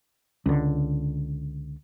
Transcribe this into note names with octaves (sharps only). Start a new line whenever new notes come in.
C#2 D3